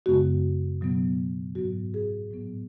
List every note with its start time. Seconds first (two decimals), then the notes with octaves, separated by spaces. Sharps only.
0.06 F#2 C#3 G#3 B3 F#4
0.81 B2 F#3 B3
1.55 G#2 F#3 B3 F#4
1.94 G#4
2.31 A2 F#3 B3